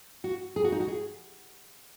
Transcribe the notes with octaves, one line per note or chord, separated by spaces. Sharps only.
F#4
G#4
F#4
D#4
F#4
G#4